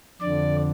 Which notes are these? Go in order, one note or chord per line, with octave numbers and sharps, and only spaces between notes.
F2 D3 D5